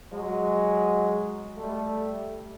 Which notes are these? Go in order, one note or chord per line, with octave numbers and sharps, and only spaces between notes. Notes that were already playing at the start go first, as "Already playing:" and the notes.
F#3 G#3
G3 A3